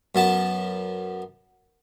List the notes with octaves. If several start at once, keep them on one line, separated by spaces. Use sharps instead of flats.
F#2 B3 A5